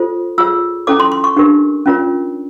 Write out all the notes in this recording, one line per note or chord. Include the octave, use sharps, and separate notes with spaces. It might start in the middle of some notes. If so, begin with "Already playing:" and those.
Already playing: F4 A4 C5
F4 G#4 C#5 E6
C#4 E4 A4 C#5 D6
C6
C6
C#6
D4 G4 A#4
C#4 F4 A#4 C#5